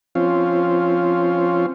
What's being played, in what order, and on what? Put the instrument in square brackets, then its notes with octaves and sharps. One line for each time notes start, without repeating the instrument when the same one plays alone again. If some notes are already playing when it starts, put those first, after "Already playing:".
[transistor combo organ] F3 C4 C#4 F4